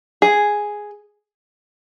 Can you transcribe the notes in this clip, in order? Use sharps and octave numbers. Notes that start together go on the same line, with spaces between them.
G#4